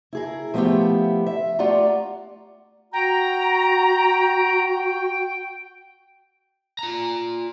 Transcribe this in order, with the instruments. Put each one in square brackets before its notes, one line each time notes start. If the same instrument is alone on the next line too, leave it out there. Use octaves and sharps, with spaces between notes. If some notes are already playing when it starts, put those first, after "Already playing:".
[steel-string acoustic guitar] E4 G#4 A#4
F3 A3 B3 E4 F4 G4
E5
A3 F4 G4 D5 F#5 A#5
[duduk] F#4 [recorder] G5 [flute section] A#5
[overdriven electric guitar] F4 A#5